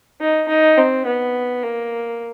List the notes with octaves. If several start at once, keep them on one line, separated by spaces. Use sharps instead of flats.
D#4
D#4
C4
B3
A#3